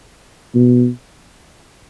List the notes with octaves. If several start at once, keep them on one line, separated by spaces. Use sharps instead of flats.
B2